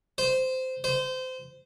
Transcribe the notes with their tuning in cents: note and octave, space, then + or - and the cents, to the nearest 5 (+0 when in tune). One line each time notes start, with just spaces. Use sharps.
C5 -15
C5 -25